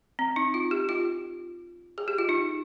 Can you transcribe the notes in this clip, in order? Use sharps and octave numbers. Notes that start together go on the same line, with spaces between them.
C4
D#4
F4
G4
F4
G#4
G4
F4
D#4